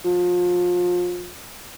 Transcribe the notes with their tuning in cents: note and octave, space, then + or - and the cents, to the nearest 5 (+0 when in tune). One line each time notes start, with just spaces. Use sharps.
F3 +30